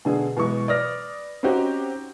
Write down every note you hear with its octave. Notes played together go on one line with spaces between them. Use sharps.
B2 D3 G#4
B2 E3 G#3 C#6
B4 D5 D#6 F6 A#6
C4 C#4 D#4 F#4 G4